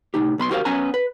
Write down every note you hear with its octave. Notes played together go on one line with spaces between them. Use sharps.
A2 C3 D#4 G4
B1 B2 B5 C6
F#4 G4 A#4 C5 E5 F5
B3 C#4 E5 F#5 G#5 A#5
B4